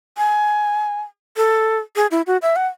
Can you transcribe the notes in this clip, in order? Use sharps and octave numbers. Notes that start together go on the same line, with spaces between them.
G#5
A4
G#4
E4
F#4
E5
F#5